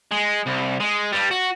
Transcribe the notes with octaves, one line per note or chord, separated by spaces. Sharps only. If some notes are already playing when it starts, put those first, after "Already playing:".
G#3
C2
G#3
G2 G3
F#4